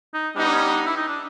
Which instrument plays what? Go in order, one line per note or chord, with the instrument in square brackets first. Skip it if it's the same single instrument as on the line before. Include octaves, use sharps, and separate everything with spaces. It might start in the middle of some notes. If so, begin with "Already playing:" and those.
[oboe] D#4
[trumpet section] G3 B3 D#4 G4 [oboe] D4
[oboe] D4
C#4
D4
E4
D#4
D4